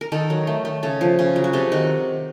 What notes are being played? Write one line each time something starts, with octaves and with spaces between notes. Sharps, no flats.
A#4
D#3 A4
F#3
A3
A3
C#3 A4
F3
C#3
F#3
F#4
C3 A4
D#3 F#4